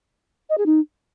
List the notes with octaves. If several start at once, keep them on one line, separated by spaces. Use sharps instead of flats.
D#5
G#4
D#4